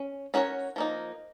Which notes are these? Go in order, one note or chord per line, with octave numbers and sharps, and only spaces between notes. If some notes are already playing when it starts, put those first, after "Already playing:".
Already playing: C#4
C#4 F#4 A#4 C#5
F3 A#3 D#4